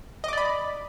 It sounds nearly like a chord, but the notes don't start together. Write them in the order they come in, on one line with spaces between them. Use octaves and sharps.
D#5 D6 D5 B5